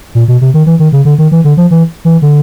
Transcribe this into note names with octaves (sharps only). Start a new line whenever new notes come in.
A#2
B2
C3
D#3
E3
D#3
C#3
D3
D#3
E3
D3
F3
E3
E3
D3